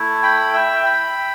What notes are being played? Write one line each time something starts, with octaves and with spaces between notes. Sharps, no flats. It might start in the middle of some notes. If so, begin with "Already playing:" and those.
Already playing: A3 E4
G5 B5
E5 G5
G5 B5